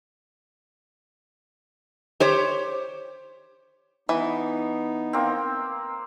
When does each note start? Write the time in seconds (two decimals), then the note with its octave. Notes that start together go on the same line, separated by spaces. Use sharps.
2.20 G4 C5 C#5
4.09 E3 B3 D#4
5.13 A#3 C4